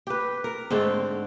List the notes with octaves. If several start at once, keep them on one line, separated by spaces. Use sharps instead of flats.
G4 B4
A#4
G#2 D3 A3 C4